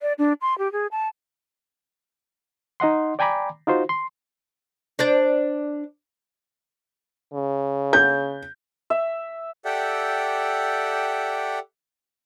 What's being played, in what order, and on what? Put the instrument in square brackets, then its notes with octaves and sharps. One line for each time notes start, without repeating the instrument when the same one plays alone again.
[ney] D5
D4
C6
G4
G#4
A5
[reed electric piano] D#4 D#5 F#5 C6
D5 G5 G#5 A#5 B5 D6
D#4 F4 F#4 C5
C6
[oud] D4 C5 D5
[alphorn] C#3
[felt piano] G6
[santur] E5
[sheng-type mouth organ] G4 A4 D5 E5 F#5 G5